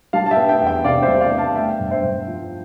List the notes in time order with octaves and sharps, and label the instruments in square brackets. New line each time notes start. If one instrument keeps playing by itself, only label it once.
[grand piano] G3 F5 A5
A5
E5 G5
B3
E5 G5
E2
E5 G5
C3 D5 F5
C5 E5
G3
D5 F5
B3
F5 A5
A3 E5 G5
G2
C5 E5
G2
F3